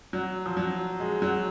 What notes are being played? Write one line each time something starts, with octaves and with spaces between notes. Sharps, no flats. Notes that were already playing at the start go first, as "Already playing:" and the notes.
F#3
F3
F#3
G#3
F#3